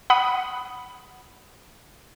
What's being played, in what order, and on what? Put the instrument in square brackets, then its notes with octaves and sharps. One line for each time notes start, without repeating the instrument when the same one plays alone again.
[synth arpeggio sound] F#5 B5 D#6